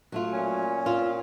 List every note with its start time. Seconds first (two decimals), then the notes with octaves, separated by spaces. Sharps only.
0.12 F#3 A3 F4
0.32 A#2 C#4
0.86 C4 F4